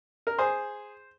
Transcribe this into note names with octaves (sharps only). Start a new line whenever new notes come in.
A#4
G#4 C5